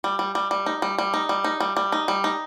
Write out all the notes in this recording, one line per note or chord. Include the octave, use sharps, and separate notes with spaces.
G3
G3
G3
G3
D#4
G3
G3
D#4
G3
D#4
G3
G3
D#4
G3
D#4